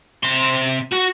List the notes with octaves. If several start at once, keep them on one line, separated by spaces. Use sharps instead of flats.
C3 C6
F#4